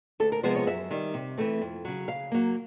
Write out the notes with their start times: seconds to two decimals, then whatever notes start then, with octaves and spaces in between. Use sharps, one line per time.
0.20 D2 A4
0.32 A#4
0.43 C3 F3 G#3 B3 C5
0.56 C#5
0.67 F#2 E5
0.91 D#3 G3
1.14 C3
1.38 E3 A3 C4
1.61 F2
1.85 C#3 F#3
2.08 C#3 F5
2.32 F#3 A#3